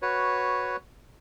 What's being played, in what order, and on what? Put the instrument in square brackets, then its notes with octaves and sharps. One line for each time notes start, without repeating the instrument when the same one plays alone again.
[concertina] F#4 B4 C#5